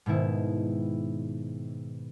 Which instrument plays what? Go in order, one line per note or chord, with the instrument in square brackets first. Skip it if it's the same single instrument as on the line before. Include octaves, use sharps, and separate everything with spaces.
[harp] G#2 B2 D#3 E4